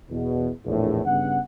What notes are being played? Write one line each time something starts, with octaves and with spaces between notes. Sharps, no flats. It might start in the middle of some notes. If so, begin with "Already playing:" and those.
E2 B2
A#1 E2 A2
G2 C#3 B3 F#5